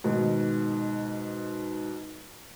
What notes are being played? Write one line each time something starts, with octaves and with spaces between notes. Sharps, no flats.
G#2 B2 D#3